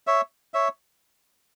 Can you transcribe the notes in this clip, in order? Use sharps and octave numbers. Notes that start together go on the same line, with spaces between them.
C#5 E5
C#5 E5